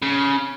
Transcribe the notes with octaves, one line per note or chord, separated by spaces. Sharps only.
C#3